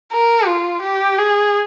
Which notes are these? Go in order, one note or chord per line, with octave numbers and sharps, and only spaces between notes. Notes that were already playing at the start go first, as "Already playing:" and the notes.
A#4
F4
G4
G#4